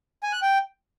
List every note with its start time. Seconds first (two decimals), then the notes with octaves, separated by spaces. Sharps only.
0.23 G#5
0.33 F#6
0.42 G5